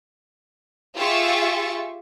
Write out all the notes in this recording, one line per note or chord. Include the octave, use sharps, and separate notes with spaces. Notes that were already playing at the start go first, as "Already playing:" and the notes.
F4 G4 G#4 E5 C#6 A6